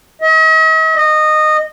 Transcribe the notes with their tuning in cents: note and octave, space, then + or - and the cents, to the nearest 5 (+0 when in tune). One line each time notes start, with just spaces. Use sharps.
D#5 +45
D#5 -15